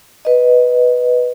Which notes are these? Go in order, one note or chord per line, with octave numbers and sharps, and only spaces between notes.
B4 D#5